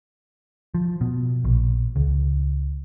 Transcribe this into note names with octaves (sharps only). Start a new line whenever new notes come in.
F3
B2
A#1
C#2